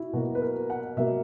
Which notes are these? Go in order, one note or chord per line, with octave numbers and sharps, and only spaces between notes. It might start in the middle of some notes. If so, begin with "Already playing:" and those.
Already playing: E4 F#4
B2 F#3 A#3 F#4
B4
A#4
F#5
B2 F#3 A#3 E5